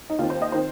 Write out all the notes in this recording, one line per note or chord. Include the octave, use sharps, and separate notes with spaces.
D#4
D#2 D#3 C4 F4
C5
D#5
D#3 C4 C5